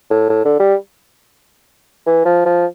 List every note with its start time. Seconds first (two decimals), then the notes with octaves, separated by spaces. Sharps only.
0.10 A2
0.29 A2
0.45 D3
0.59 G3
2.06 E3
2.25 F3
2.45 F3